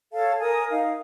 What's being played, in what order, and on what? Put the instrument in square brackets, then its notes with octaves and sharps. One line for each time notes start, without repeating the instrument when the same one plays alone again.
[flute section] A4 C#5 F5 A5
A#4 G#5 D#6
D#4 F5